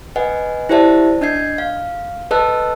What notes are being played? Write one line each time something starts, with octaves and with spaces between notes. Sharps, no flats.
B4 D#5 F#5 G#5
E4 G4 C5 D5 E5 A5
D4 D#5 G6 G#6 C7
F5
A4 B4 D#5 A5 E6 F#6